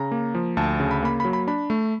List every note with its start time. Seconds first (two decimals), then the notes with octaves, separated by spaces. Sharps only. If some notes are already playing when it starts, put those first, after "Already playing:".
Already playing: C#3 A#5
0.12 A#3
0.35 F3
0.57 D2 A5
0.80 C#3
0.91 B5
1.03 A#3 B5
1.20 B5
1.25 F#3
1.33 B5
1.47 D4 B5
1.70 A3